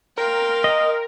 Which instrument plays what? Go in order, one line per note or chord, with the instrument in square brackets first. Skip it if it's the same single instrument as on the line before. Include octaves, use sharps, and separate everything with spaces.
[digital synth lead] A#4 [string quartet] F5 G5 C6
[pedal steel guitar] D#5